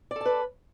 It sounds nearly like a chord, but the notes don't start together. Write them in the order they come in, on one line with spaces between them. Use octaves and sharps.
D5 A4 A5 B4